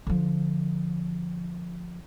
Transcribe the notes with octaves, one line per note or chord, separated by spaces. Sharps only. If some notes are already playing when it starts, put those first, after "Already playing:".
D3 F3